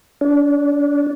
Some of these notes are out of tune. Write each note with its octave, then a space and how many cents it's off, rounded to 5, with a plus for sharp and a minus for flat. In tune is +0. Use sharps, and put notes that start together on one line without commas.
D4 -35